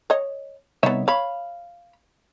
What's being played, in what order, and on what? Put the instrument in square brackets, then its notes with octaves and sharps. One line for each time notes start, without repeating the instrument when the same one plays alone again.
[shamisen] C#5 D#5
[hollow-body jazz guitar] C2 C#5 E5 [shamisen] B3 D#4
[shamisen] C#5 [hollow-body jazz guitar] F5 B5